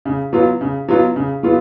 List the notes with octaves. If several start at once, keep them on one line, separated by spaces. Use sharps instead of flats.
C#3
F#3 B3 F4
C#3
F#3 B3 F4
C#3
F#3 B3 F4